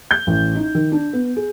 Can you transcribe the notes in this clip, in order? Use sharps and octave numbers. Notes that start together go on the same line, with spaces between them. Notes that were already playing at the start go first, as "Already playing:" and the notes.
G6
A1
D#4
D#3
D4
B3
G#4